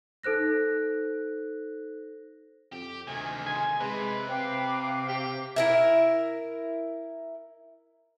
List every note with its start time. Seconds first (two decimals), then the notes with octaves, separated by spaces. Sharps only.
0.23 D#4 A4 C5 F#6 A#6
2.72 F2 G4
3.07 D2 C3 D#3 G#5
3.46 G#5 C6
3.80 C3 G#3 B4
4.28 C4 F5 G5 D6
5.09 G4
5.56 E4 A#4 E5